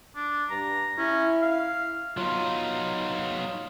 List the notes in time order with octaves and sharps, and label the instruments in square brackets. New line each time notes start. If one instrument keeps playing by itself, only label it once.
[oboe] D4
[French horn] G2 [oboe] A#5
[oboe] C#4 [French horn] E4
[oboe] F5
[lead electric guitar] F#3 D#4 [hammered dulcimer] F4